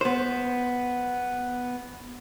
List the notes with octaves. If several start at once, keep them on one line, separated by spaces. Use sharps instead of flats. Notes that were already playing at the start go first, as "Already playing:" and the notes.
B3 C5